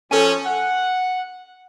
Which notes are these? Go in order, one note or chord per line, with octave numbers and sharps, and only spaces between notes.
F3 C#4 A4 G#5
F#5